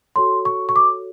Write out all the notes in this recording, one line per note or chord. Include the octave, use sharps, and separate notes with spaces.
F#4 A4 C#5 C6
C#6
C#6
D6